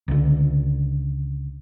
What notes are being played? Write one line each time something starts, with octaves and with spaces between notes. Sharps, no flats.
C#2 D3